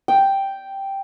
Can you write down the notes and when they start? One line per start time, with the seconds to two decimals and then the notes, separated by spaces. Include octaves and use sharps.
0.08 G5